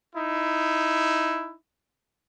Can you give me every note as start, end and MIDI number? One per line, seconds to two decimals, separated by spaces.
0.15 1.55 63
0.15 1.55 64